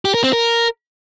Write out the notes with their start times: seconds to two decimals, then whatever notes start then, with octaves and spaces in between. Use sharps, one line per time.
0.05 G4
0.14 A#4
0.24 C4
0.33 A#4